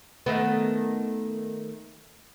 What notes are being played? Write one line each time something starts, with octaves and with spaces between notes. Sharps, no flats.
D#3 A3 B3